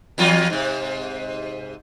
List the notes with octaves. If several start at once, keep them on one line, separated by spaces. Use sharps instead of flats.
E2 F#3 F4
G#2 C3